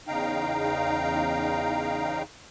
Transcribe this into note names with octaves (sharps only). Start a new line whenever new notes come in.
E2 C#3 D#4 F5 G5 A#5